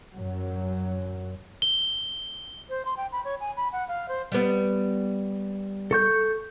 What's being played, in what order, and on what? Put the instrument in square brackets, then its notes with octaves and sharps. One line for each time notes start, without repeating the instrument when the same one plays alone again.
[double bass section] F#2 F#3
[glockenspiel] G7
[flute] C5
C6
G5
B5
C#5
G#5
B5
F#5
F5
C5
[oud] G3 B3
[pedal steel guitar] A4 C#6 G6